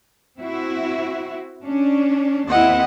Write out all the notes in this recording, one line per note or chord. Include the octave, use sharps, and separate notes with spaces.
C4 E4 F#4
C#4 D4
D#2 C4 E4 D#5 F#5